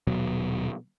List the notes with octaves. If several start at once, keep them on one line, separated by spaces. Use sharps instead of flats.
D#1 B2 F#3